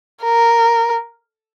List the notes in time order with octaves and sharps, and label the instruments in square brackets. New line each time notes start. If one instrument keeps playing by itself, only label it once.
[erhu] A#4